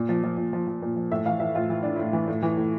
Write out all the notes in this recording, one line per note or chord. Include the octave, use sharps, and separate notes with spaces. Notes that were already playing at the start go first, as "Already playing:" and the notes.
Already playing: A#2
F3
F3
A#2
F3
F3
A#2
F3
A2 E5
E3 F5
E3 E5
A2 F4
E3 E4
E3 D4
A2 E4
E3
A2
E3
A2